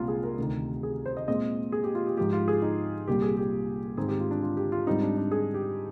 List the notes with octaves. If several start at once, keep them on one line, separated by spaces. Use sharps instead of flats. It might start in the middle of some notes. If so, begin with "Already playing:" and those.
Already playing: C2 A#2 G#3 C4 F4
G#4
A#4
D2 C3 D#3
G#4
C5
D#5
A#2 G#3 C4 D#5
G#4
G4
F4
G4
G#2 F3 G#3 G4
F4
G#4
D#4
C2 A#2 G3 G4
G#4
G4
G#2 D#3 G#3 C4 G#4
G4
F4
D4
F4
G4
F4
G#2 G3 C4 D#4
D4
D4
G#4
G4